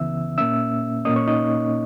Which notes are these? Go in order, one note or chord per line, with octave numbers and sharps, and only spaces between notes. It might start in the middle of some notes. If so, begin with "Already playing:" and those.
Already playing: C#2 C#3 E3 B3 E5 E6
A#2 A#3 C#4 E5 E6
A#2 A#3 C#4 D#5 D#6
C#5 C#6
D#4 D#5